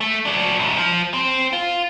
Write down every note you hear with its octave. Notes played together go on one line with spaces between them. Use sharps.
A3
F#3 D4
B1 F#2
F3
C4
F4